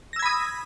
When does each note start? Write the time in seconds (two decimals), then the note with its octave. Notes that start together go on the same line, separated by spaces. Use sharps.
0.13 A#6
0.16 E6
0.19 G#6
0.22 B5
0.26 D#6